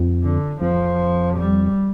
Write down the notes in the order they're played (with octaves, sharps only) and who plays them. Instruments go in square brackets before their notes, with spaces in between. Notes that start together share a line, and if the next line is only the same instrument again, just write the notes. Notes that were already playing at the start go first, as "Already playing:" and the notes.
Already playing: [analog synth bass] F2
[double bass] D3
[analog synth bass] F2 [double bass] F3
[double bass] G3